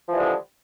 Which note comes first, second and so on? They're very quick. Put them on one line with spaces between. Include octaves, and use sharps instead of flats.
F3 E3 G3 G#3 D3